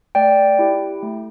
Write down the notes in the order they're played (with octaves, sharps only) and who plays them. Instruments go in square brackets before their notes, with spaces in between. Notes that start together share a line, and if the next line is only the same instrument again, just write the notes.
[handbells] A3 D5 G5
E4 G4
A3